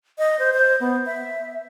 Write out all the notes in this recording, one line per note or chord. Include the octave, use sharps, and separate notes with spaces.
D#5
C5
C5
B3
E5